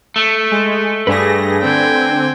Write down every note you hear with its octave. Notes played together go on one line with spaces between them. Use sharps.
A3
G#3
G2 D4 G#4 B4 A#6
D3 C4 G5 G#5